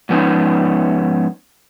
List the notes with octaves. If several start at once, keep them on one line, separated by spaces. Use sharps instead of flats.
G#2 F3 B3 C#4 D#4